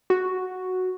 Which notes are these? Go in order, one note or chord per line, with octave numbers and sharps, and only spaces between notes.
F#4